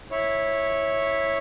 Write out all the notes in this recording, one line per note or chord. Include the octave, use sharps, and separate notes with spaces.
E4 C#5